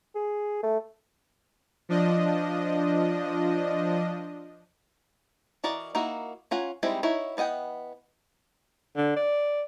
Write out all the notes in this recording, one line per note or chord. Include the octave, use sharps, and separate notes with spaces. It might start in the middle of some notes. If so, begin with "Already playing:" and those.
G#4
A3
F3 D4 D#5
E3 F#4 A#4 D5 D#5
A#3 D#4 E4 F#4
C#4 F4 F#5 G#5 A#5
G3 G#3 C4 D#4 E4
D#4 E4 F#4 C#5
E3 B3 D#5 F#5 G5
D3
D5